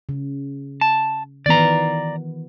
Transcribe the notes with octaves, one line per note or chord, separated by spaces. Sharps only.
C#3
A5
D#3 E3 B3 D5 A#5